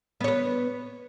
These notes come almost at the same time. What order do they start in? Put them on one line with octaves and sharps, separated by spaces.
B3 C#5 B4